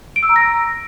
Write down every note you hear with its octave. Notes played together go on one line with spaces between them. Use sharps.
D7
E6
A#5
A#6